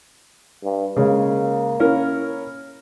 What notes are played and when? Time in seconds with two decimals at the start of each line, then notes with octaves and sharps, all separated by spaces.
0.64 G2
0.97 C#3 G#3 A#3 C#4
1.80 C#4 E4 A#4